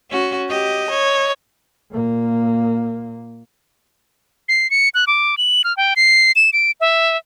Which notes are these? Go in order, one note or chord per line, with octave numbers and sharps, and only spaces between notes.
C#4 F#4
G4 D#5
C#5
A#2 A#3
C7
C#7
F#6
D6
F#7
F6
G5
C7
E7
D7
E5